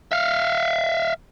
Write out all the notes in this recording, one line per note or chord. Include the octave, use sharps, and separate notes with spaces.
E5 F5